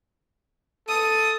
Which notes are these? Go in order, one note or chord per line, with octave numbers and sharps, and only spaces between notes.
A4 D#6